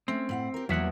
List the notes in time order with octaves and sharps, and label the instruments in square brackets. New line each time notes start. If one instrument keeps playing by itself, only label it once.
[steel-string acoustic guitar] A3 C#4 [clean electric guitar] C4
[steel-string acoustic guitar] A2 F5 F#5
G4 A#4
[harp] E2 [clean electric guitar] F#3 E5 F#5 [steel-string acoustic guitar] G3 A#3